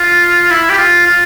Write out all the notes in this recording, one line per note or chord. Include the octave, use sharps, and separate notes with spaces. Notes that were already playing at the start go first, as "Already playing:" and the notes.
Already playing: F4
E4
G4
F4
F4